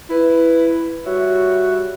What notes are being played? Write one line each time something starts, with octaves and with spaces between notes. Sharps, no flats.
E4 B4
G3 F#4 C#5 E5